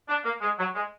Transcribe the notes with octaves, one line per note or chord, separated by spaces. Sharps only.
D4
A#3
G#3
F#3
G#3